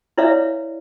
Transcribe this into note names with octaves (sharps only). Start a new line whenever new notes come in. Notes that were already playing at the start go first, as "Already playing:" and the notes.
E4 B4 C#5 D5 E5 F5